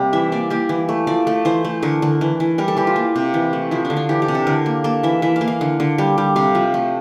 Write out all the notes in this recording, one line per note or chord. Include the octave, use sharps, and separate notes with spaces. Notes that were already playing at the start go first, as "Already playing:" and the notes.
Already playing: C3 G3 A#3
E3 E5
A#3 D5
A#3 G4
E3
A3
F3 D5
A3
E3 C5
A3
D3 A#4
D3
E3
E3
G3 A#4
A4
E3 G4
F4
A#3
C3
E3
A3
F3 E4
D4
D3
D4
E3 G4
G4
C3
A4
D3 A#4
A#3
A#3 A4
E3 E5
E3 E5
F5
A#3
F5
D3
D3
G3
G3
C3 F5
F3
A3